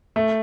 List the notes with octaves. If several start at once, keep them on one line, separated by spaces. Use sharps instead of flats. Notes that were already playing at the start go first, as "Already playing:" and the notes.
A3